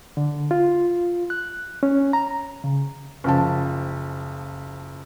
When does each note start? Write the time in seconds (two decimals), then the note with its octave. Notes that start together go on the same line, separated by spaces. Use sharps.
0.17 D3
0.51 F4
1.30 F#6
1.83 C#4
2.13 A#5
2.64 C#3
3.24 F#1 F3 A5